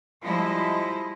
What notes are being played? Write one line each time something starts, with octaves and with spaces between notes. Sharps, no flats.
F3 G3 G#3 E4 D#5